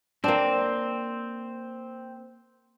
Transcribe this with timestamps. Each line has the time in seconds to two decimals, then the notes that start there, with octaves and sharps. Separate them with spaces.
0.24 A#3 C4 D4